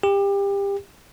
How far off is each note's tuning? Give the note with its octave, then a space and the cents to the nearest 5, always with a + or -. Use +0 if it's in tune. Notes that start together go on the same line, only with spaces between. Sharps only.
G4 +25